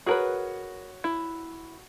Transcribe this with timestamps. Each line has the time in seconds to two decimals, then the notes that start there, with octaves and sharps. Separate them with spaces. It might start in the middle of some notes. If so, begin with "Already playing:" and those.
0.06 F#4 G#4 A#4 B4 C#5
1.04 E4